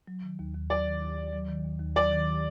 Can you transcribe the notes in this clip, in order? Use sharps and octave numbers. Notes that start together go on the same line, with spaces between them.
F#3
D#3
D#2
D#2
F#3 D5
D#3
D#2
D#2
F#3
D#3
D#2
D#2
F#3 D5
D#3